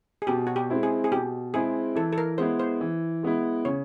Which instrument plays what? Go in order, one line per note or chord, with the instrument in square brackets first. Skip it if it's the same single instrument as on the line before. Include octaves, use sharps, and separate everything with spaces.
[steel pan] G#4
[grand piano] B2 [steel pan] G4
[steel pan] F#4
G4
[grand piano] G#3 C4 E4
[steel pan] G#4
G#4
[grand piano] B2 [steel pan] G4
[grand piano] G#3 C4 E4 [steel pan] G#4
[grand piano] E3 [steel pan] A4
[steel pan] A4
A#4
[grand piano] G#3 B3 E4 [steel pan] C5
[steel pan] C5
[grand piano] E3
G#3 B3 E4
[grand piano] C#3 [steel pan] C#5